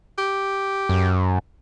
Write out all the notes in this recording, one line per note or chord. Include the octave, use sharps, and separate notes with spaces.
G4
F#2